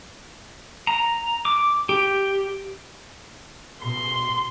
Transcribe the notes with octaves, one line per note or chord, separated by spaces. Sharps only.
A#5
D6
G4
B2 C6